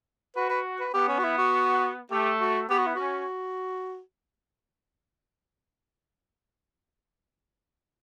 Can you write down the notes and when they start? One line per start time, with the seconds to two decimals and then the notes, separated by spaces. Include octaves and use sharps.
0.36 F#4 B4
0.50 B4
0.80 B4
0.94 B3 G4
1.08 C#4
1.19 F#4
1.24 E4
1.38 F#4
2.11 A3 G4
2.40 F#4
2.69 B3 G4
2.78 F#4
2.87 E4
2.95 C#4 F#4